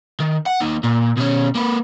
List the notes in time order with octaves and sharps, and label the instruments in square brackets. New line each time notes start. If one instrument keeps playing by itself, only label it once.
[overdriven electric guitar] D#3
F#5
D#2 D#4
A#2
B2 C#4
A#3 B4